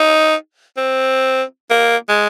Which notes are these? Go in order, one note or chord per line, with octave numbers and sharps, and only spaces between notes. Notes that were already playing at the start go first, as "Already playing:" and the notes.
Already playing: D#4
C4
A#3
G#3